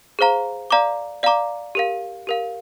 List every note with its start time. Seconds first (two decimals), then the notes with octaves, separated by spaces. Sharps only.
0.19 G#4 C5 F5 A#5
0.71 D5 F5 A#5 D6
1.23 D5 F5 A#5 D6
1.75 G4 A#4 F5
2.27 G4 A#4 F5